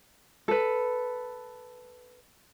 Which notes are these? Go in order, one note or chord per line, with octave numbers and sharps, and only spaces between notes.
A4 B4